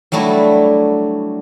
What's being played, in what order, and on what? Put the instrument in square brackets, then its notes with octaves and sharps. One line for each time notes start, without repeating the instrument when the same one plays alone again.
[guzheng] F#3 G3 A3 D4 E4